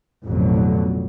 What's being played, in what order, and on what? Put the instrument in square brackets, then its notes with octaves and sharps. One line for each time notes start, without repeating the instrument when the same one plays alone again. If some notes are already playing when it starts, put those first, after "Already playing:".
[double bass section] A1 F2 B2 D3 F#3